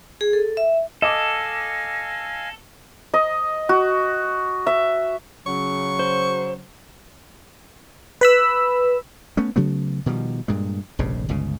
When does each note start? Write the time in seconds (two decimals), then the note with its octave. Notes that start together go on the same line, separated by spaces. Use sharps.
0.21 G#4
0.33 A4
0.57 E5
1.02 A4 D#5 F5 G#5 D6 A#6
3.14 D#5
3.69 F#4
4.66 E5
5.46 C#3 F#3 C#6
5.99 C5
8.21 B4 B5 E6
9.37 A3 B3 C#4
9.56 C#3 F#3 A3 B3
10.06 B2 D#3 F3 G3
10.48 G2 A#2 G#3
10.99 F1 A#1 G2 C#3
11.29 G1 C#2 C#3